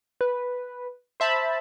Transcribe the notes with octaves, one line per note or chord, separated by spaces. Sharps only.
B4
C5 E5 A5 B5